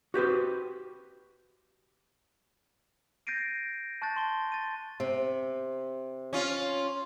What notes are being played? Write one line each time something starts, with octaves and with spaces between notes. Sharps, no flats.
F#4 G4 B4 C5
G6 A6 A#6 C7 D7 D#7
A5 C#6 F#6 G6 A6
C6 G7
A6 D#7
C3
C#4 F4